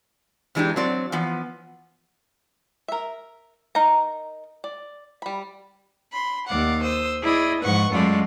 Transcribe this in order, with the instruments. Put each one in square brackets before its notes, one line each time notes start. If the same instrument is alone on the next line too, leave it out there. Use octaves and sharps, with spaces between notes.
[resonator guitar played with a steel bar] E2 E3 G#3 D4 D#4 G4
F#3 C4 D5
E3 F3 B3
[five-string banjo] A#4 E5
D#4 A#4 A#5
D5
G3 B5
[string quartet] B5 C6
D#2 D5 F5 F#5
C5 D#6 E6
E4 G#4 D5 D#5
G#2 F3 B4 F#5 C#6
F#2 G#3 A3 F4 D5